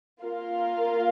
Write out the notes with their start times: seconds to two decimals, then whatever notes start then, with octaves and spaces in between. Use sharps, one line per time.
0.20 A#3 F4 A#4 F5